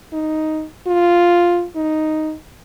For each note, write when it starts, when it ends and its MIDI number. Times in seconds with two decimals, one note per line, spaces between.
0.13 0.65 63
0.87 1.65 65
1.76 2.35 63